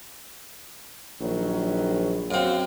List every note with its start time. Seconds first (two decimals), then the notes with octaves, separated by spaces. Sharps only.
1.21 A#1 D#3 F#3
2.31 F#2 F#3 C4 F#4 F5